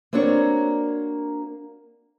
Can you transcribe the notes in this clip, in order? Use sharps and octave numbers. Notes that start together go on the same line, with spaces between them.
A#3 C4 D4 F#4 C#5